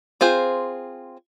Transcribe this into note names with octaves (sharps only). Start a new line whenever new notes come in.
C4 F4 G#4 C5